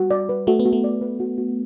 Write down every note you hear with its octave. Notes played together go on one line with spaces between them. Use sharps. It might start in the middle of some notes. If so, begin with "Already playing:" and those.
Already playing: G3 F#4
D5
B4
A3 F#4
B3
F#4
A3
D5
B4
F#4
F#4